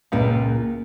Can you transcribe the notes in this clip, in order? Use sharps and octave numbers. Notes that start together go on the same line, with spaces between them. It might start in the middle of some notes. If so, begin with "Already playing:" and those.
C#2 A#2